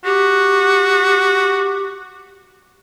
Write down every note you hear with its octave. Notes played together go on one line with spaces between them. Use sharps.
F#4 G4